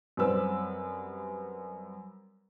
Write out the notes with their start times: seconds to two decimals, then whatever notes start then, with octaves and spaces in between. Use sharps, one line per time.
0.17 F#2 G3 C4 B4 E6